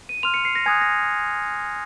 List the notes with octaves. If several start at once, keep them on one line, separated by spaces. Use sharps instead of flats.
D#7
C6 F6 F7
C#7
C7
A#6
G#5 D#6 F#6 G#6
A#6